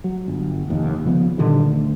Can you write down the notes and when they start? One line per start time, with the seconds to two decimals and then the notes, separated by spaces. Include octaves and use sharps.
0.04 F#3
0.28 G1
0.67 F1 D#2
1.05 C#3 F3 B3
1.38 G2 A#2 D3 D#3
1.64 D2